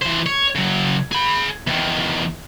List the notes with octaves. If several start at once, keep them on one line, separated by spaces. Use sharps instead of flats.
E3 C5
C#5
C#3 F#3
G#4 B5
E2 D#3